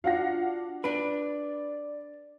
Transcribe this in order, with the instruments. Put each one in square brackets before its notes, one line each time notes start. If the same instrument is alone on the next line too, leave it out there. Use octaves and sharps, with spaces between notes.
[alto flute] D4 [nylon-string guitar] F4 F#4 [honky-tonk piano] F5 F#5 A#6
[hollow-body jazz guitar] D4 B4 [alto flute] D5 [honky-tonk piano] D7